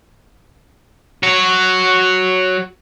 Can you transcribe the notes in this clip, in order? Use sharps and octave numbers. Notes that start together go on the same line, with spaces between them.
F#4 C#5